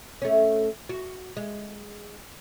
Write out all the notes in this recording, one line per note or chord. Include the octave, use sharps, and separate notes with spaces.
A3 C#4
F#4
G#3